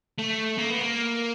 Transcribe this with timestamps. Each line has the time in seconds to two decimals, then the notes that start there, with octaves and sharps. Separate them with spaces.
0.18 A3
0.58 A#3
0.70 B3
0.81 A#3